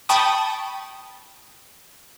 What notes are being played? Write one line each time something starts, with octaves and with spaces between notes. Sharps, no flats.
G5 A5 B5 C#6 D#6